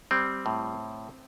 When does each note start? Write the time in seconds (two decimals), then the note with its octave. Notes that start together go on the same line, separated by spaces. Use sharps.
0.11 G3 C4
0.46 A2